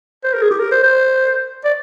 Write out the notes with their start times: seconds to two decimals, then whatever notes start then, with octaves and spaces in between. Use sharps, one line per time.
0.24 C5
0.33 A#4
0.42 G#4
0.51 G4
0.59 A#4
0.71 C5
0.83 C5
1.64 D5